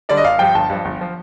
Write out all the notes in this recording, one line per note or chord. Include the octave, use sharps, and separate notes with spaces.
D3 G3 D4 D5
D#5
G1 F5
G2 F3 G5
G1 A5
G2 F3
G1
F3